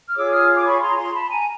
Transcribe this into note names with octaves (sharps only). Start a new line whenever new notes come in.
F6
F4 G#4 C#5 D6 E6
D#6 F6
D6
B5 C#6
A#5 C6
A#5 C6
A5 B5
G#5 A#5